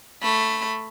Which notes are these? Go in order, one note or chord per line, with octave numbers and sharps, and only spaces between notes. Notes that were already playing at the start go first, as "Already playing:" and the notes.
A3 B5